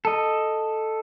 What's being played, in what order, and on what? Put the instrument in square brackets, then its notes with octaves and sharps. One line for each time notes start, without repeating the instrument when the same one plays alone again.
[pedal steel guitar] A4 D#5